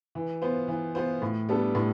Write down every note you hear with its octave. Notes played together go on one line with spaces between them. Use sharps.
E3
B3 F4 C5
E3
B3 F4 C5
A2
G3 B3 D4 A4
A2